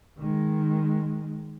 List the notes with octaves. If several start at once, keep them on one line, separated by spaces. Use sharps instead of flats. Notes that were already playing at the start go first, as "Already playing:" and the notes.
D#3 G#3